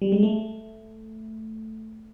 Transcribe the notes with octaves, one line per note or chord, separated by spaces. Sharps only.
G3
G#3
A3